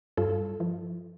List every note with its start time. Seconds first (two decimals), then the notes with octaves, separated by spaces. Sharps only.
0.17 G2 F4 A4
0.60 F3